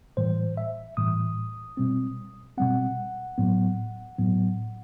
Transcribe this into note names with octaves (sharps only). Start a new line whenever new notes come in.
A2 E3 G3 C5
E5
A2 E3 G3 D#6
B2 G3 C4
B2 G3 C4 F#5
A2 F#3 B3
A2 F#3 B3